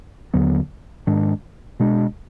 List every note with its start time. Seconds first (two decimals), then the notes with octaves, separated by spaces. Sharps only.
0.34 D#2 D3 F#3 B3
1.07 G#2 D#3 G#3 D4
1.80 B2 G#3 D4